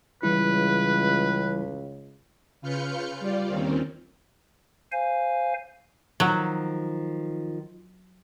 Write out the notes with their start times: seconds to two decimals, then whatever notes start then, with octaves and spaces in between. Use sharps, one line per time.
0.23 C#2 E3 G3 E4 B4
2.61 C#3 F4 B4 F6 G6 C#7
3.20 G3 F4 D5
3.48 D#2 D#3 C4 C#4
4.92 C5 F5 G#5
6.20 D#3 F3 F#3